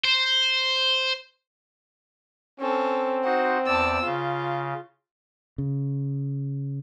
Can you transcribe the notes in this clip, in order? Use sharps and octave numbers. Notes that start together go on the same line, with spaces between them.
C5
C4 C#4 A4
D#4 F#4 C5 F#5
E2 D5 A5 E6
C#3 F4
C#3